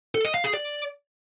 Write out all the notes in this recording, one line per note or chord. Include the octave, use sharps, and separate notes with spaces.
A4
D#5
F5
G#4
D5